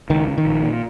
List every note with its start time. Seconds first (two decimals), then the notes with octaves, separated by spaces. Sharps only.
0.10 C#2 D#3
0.28 C#3
0.38 D#3
0.45 A#1
0.63 A#2